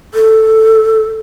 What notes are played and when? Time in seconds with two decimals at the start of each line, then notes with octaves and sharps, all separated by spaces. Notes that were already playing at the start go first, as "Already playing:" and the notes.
0.14 A4